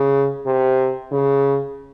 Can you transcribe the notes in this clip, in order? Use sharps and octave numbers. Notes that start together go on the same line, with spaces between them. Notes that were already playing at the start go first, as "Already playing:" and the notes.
Already playing: C#3
C3
C#3